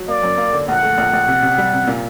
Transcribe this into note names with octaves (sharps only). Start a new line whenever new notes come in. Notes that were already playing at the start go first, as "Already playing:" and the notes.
Already playing: F#3
A#3 D5
F#2
A#3
D3
A#1 F#5
A3
A#1
A#1
C3
C3
G3
C3
A#2